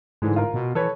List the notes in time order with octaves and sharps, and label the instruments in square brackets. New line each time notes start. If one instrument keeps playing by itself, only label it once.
[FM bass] G#2 [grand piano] D3 E3 G#3
[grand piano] F4 A#4
[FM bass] B2
[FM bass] E3 [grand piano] A4 B4 C#5